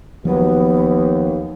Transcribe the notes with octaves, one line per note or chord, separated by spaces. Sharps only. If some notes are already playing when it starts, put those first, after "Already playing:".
D#2 F3 F#3 B3